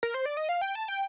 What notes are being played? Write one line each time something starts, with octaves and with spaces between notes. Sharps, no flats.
A#4
C5
D5
D#5
F5
G5
A5
G5